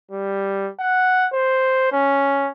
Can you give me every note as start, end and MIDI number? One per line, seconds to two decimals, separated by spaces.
0.11 0.70 55
0.80 1.26 78
1.33 1.90 72
1.92 2.50 61